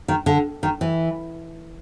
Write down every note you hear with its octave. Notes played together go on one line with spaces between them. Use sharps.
D#3
D3
D#3
E3